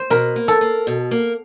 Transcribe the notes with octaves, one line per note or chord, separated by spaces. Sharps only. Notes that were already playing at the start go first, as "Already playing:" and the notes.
Already playing: C5
B2 A#4
A#3
A4
A#3
B2
A#3